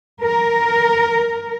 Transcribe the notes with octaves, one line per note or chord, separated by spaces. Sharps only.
A#4